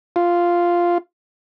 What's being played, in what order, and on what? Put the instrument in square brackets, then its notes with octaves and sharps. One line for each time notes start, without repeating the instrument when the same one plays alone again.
[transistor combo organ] F4